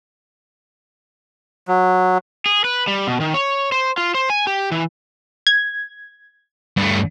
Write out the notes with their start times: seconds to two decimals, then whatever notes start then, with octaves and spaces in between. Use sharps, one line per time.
1.68 F#3
2.46 G#4
2.64 B4
2.87 G3
3.07 B2
3.21 D#3
3.34 C#5
3.72 C5
3.98 F4
4.14 C5
4.30 G#5
4.47 G4
4.72 E3
5.47 G#6
6.77 G2 A3